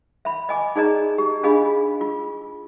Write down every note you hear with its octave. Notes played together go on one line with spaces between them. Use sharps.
E5 B5
D#5 G#5 D6
D#4 G#4 D5 D#5 A#5
G4
D4 F4 G#4 D#5 F5 B5
F4